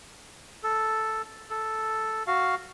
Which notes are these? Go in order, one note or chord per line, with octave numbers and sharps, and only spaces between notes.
A4
A4
F#4 F5